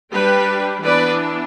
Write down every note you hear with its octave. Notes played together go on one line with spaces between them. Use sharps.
G3 D4 G4 B4
E3 B3 D4 B4 D5